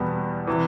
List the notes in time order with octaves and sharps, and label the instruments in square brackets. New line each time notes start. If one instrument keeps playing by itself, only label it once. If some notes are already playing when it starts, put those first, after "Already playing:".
Already playing: [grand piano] E2 B2 G3 B3
C3 E3